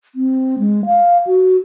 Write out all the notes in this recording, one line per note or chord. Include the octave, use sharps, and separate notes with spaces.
C4
G#3
F5
F#4